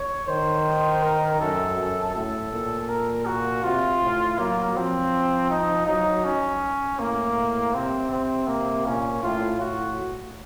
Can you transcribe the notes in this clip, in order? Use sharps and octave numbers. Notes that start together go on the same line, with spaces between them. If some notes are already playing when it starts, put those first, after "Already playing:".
Already playing: C#5
D#3 C5
A#4
F#2 A4
F#2
A2 A4
A#2
A#4
F#4
C3 F4
A2
F#3 A#3
F3 C4
D#4
F#3 D#4
C#4
A2 A#3
C3 C4
C4
A#3
A#2 C#4
A2 F4
A2 F#4